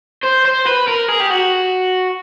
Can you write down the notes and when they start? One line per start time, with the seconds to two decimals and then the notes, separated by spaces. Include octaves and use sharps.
0.23 C5
0.45 C5
0.66 B4
0.88 A#4
1.08 G#4
1.20 G4
1.30 F#4